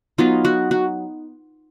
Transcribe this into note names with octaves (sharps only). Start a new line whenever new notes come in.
F#3 B3 D#4 F4
F#4
F#4